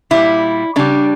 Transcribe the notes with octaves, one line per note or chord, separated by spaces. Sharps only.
A#2 G3 E4
C#3 G3 D4